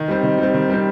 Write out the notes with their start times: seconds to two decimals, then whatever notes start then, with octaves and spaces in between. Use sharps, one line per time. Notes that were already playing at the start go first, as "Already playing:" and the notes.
Already playing: D#3
0.08 G3 C4
0.24 D#3
0.39 G3 C4
0.54 D#3
0.70 G3 C4